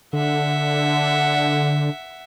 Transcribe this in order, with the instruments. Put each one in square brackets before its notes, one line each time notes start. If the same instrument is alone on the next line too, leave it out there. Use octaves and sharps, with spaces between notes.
[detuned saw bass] D3 [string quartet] E5 F#5